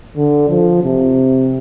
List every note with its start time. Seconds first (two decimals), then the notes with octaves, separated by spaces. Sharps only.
0.17 D3
0.50 F3
0.83 C3